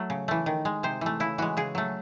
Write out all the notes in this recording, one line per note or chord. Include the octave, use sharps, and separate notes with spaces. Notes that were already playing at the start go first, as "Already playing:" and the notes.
Already playing: F#3 A3
C#3
E3 A3
D#3
G#3
C3 C5
E3 A3
C#3 E4
E3 G#3 F#4
C#3 G#4
F#3 A3